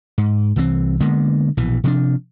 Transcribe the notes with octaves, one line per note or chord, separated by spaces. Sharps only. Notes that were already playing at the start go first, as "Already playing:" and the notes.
G#2
C2 E3 F#3 C4
D3 G#3 A#3 B3
A#1 B2 E3
C3 F3 D4